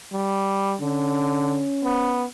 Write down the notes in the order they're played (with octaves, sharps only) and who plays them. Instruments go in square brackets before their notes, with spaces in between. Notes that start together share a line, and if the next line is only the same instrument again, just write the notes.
[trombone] G3
[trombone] D3 [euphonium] C#4
[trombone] B3